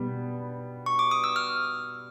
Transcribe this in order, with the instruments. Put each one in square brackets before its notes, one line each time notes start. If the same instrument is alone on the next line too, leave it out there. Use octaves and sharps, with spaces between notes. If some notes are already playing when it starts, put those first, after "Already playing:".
Already playing: [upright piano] B2 G3 B3
[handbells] C#6
D6
D#6
E6
F6